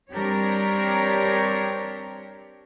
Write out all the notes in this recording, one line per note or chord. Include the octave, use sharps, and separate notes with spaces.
G3 C4 D4 G4 A#4 C#5